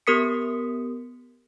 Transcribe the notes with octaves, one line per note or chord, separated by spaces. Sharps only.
B3 G4 A#4 D#6 B6 C#7